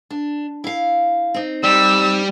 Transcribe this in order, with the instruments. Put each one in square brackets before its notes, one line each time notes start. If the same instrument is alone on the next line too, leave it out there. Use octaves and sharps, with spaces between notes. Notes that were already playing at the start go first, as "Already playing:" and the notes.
[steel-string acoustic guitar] D4
E4 F5
C4 D#4
[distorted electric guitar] G3 [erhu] E6